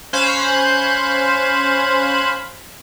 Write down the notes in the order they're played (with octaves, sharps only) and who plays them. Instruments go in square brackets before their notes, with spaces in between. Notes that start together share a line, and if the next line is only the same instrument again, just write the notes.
[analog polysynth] C#4 C5 F5 B5 F#6 G#6